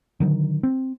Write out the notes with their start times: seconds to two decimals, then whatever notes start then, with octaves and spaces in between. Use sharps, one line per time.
0.20 D3 D#3 F#3
0.63 C4